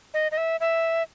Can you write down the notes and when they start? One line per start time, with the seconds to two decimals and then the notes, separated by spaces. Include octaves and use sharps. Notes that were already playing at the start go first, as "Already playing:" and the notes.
0.14 D#5
0.32 D#5
0.38 E5
0.60 E5